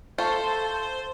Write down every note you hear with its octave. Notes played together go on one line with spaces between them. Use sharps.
A3 F4 A4 C5